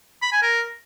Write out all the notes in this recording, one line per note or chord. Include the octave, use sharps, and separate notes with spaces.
B5
G#5
A#4